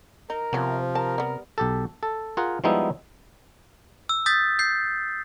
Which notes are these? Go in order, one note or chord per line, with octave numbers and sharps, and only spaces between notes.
D#4 A#4
C3 F3 B3 C#4
A#4 A5
G3 B3
B1 G4 A4
A4
F4 G#4 A#4 F#5
F3 G3 G#3 B3 D#4 E4
E6
D#6 G6 A6 B6
G6 C7